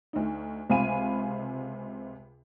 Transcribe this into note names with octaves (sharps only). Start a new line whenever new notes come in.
D2 D#4
C#2 C3 F5 G#5 B5 D#7